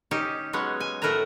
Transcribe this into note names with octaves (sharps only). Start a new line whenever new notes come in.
C#4 D#4 G4
F#3 G#3 B3 C#4 C#5
G#5
A2 A3 A#4 B4 E5 A#5